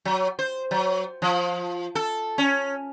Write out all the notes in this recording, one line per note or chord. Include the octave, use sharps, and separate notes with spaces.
F#3
C5
F#3
F3
A4
C#4